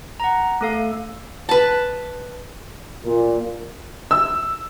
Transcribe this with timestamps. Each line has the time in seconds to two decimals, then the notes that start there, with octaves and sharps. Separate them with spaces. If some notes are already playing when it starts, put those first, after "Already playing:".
0.20 F#5 A#5
0.61 A3 A4 F5
1.49 B4 A5
3.05 A#2
4.11 E6